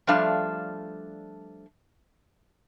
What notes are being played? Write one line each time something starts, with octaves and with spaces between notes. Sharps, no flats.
F3 G3 A3 D4 F5 A5